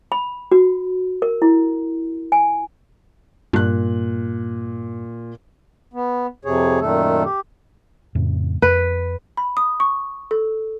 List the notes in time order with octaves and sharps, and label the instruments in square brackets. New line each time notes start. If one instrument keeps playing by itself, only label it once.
[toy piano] B5
F#4
A#4
E4
G#5
[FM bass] G2 [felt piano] A#2 F#6
[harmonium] B3
F2 C3 G#4 C#5
F#2 A#2 D#3 A3 A4
G4
[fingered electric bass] F2 A2 C#3
[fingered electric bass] F2 [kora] B4
[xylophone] B5
D#6
C#6
A4